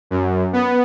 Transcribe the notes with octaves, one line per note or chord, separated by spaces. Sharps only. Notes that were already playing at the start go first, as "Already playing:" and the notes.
F#2
B3